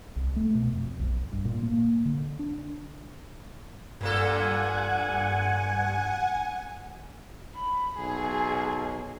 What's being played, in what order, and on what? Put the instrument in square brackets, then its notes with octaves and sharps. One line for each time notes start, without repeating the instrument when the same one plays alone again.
[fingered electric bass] C2
A3
B2
F2
B1
G2
A#2
A#3
D3
D4
[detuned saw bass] G2 [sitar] A#2 A#3 A4 [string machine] F#5 G#5
[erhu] B5
[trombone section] B1 [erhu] G#4